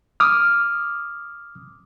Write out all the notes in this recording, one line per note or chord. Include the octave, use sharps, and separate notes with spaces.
D6 D#6 F6